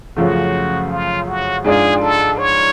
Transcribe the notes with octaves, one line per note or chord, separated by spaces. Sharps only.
F#2 C#3 F3 A3 F#4
F4
F#4
G#2 G#3 D4 F4 G#4
A4
C#5